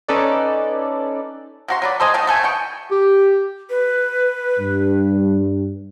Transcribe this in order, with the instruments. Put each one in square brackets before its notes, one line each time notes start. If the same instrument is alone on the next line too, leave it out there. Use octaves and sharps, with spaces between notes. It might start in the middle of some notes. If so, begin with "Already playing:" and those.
[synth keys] C#4 D#4 A4 B4 D5
[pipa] C3 F#4 C6
F#3 B4 D5
A4 C5 D#5 G#5
D#3 A3 D#4
B2 A3 A4 G#5
B2 G5 C#6
[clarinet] G4
[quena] B4
[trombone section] G2